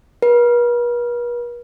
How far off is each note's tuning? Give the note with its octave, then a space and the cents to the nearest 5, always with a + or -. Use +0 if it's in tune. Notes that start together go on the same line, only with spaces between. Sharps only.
B4 -45